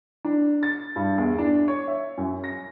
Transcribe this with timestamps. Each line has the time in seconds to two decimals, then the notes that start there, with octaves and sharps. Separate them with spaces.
0.25 D4
0.63 A6
0.96 G2
1.18 E2
1.38 D4
1.68 C#5
1.88 E5
2.18 F#2
2.44 A#6